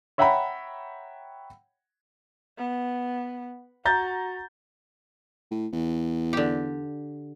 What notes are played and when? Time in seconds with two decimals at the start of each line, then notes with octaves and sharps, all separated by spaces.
0.18 C#5 E5 F#5 G5 A#5 B5
2.58 B3
3.85 F#4 A#5 G6 A6
5.51 A2
5.73 E2
6.33 D3 G4